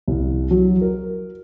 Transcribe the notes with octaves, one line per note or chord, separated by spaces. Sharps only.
C2
F#3
A#4